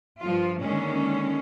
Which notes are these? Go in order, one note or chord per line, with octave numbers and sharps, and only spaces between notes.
G2 F3 F4
D3 D#3 G#3 A#3 C#4